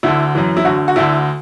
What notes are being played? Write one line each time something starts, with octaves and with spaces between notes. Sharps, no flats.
D2 D3 E4
F#2 E3
E4
D2 D3 F#4
F#4
D2 D3 E4